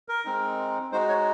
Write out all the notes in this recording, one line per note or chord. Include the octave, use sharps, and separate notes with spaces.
A#4
G#3 C4 D#4
G#3 D#4 F#4 C5
C#5